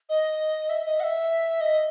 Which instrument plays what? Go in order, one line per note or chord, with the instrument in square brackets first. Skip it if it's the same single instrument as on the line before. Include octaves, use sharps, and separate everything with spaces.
[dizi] D#5
E5
D#5
F#5
E5
D#5